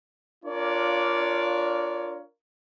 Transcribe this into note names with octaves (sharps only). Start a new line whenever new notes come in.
D4 F4 A#4 C#5 D5